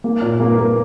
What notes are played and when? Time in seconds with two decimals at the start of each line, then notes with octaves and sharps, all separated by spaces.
0.04 A#3
0.22 A#2
0.40 A#3
0.59 A#3